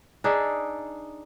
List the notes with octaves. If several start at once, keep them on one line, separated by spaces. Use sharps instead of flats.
D4 D#4 G#4 E5